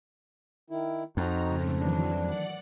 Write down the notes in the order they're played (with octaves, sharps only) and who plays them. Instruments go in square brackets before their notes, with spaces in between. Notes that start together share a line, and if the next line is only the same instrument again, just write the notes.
[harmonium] D#3 E4
[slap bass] F2 [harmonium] D#4 F#4 [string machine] A#5
[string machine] G#2 C#3 A3
[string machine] D#3 E3 F#3 [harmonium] D4
[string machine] D5 F#5 F#6